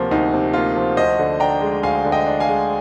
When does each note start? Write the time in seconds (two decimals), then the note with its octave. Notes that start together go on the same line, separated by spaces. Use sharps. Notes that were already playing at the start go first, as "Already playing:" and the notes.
Already playing: D2 C3 F3 A#3
0.11 D2 D#4
0.33 C3
0.54 A#3 F4
0.76 F3
0.97 D2 C5 D#5
1.19 D3
1.40 D4 G5 A#5
1.61 G#3
1.83 D2 F5 G#5
2.05 D3
2.12 D#5 G5
2.26 D4
2.40 F5 G#5
2.48 G#3